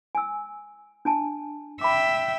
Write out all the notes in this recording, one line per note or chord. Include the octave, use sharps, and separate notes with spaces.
G#5 E6
D4 G#5 A5
E5 G5 B5 D6